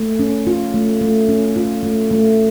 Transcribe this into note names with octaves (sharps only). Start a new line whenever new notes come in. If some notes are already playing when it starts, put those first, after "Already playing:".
Already playing: A3
C#4
F4
A3
A3
C#4
F4
A3
A3